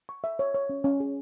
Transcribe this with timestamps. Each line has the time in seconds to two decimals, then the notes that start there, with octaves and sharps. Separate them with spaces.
0.09 C#6
0.24 E5
0.39 C#5
0.54 C#5
0.69 C#4
0.84 C#4
1.00 G#4